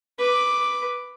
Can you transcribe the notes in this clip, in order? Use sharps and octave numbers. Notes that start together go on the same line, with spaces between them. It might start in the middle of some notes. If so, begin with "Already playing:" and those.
B4 D6